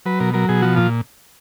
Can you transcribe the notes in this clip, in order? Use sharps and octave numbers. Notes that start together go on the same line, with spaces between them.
F#3 B4
B2 A#4
F#3 A#4
B2 G#4
F3 F#4
A#2 F4